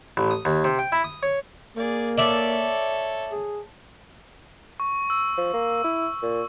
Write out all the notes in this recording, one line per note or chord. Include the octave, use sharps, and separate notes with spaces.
A1
D#6
D#2
C3
G5
E4
D#6
C#5
A#3 G#4 D5
A4 C#5 D5 E5
G#4
C#6
E6
F3
A#3
E4
A#2